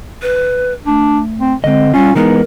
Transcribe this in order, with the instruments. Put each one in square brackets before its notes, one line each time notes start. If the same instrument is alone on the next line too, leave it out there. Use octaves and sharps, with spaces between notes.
[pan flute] B4
[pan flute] A3 [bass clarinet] D4
[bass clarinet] C4
[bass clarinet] D3 [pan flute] G#3 [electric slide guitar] C4 D#5
[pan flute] G3 [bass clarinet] C#4 [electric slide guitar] F4
[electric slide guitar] E3 G#3 B3 [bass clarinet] D#4 [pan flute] A#4